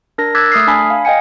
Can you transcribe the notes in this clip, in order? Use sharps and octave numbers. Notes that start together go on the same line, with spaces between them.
D4 A#4 A#6
D6 E6 F#6 G#6 A6 B6
A3 D#6 F6 C7
D4 G#5 B5 B6
F5
D#5 F5 G5 G#5 C#7